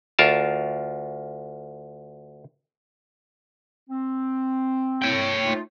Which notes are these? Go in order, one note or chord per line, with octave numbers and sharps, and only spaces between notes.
D2 F4 A#4 A5
C4
C#5 G5
A3 D#4 F4